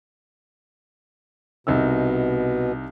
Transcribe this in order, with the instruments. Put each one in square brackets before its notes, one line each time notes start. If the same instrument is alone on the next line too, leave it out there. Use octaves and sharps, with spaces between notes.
[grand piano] C2 D#4 E6 [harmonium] B2